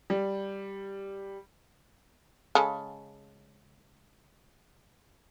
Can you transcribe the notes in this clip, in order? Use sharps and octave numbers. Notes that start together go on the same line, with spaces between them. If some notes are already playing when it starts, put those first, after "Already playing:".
G3
C#3 G#3 A4